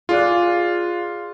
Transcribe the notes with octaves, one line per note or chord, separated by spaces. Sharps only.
F4 G#4 D5 F#6